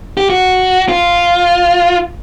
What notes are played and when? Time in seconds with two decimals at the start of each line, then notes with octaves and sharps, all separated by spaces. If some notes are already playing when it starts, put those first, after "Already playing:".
0.17 G4
0.30 F#4
0.89 F4